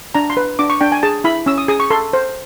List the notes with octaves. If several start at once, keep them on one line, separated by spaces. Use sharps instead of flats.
D4 A#5
C6
B4
D4 D6
C#6
D4 G5
G#5
G#4 A5
E4 B5
C#4 E6
D#6
G#4 D#6
C#6
A4 C6
C5